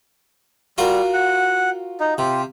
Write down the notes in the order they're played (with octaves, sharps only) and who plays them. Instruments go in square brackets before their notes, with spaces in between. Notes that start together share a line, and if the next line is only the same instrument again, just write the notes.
[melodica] G3 [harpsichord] F4 F#4 A#4
[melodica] F#5
D#4
[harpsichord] C3 [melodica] F4 G4